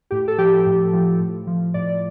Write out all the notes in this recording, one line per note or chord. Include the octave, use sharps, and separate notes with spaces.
A2 G4
A4
F3 G4
A2
F3
A2
F3
A2 D5